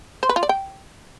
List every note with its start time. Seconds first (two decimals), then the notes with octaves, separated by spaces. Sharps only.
0.23 C5
0.29 B4
0.36 F4
0.43 D5
0.49 G5